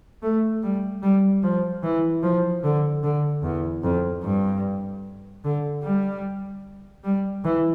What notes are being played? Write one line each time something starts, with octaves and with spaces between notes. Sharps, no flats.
A3
G3
G3
F3
E3
F3
D3
D3
E2
F2
G2
D3
G3
G3
E3